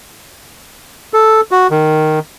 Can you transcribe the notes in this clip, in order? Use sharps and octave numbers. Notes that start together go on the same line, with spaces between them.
A4
F#4
D#3